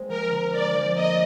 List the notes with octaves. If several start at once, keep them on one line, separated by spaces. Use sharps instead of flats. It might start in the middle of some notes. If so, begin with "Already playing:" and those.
Already playing: G#3 A#3 C4
F3 A#4
D3
G#3 D5
F3
A#3 D#5